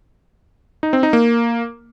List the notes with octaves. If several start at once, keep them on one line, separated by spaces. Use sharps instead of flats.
D#4
C4
D#4
A#3